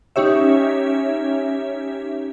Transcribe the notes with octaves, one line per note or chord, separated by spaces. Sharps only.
C#4 D#4 G4 C#5 E5